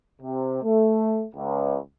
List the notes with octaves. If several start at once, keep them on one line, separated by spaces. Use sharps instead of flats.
C3
A3
C#2